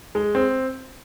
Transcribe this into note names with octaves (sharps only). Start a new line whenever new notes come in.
G#3
C4